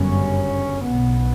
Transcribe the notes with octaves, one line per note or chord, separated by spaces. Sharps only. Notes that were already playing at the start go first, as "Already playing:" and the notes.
Already playing: G1 F#2 C#3 C#4
B1 B2 B3